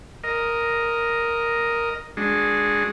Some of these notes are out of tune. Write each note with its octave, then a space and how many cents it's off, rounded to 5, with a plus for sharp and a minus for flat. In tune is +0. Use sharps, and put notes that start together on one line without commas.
A#4 +0 D#5 +0
G#3 +0 D4 +0 F#4 -30